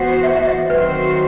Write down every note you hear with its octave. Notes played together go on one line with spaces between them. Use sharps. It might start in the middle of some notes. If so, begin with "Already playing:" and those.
Already playing: E3 B3 F#4 C5 F#5
E5
E5
D#5
D#3 F#3 C4 F#4 B4 C5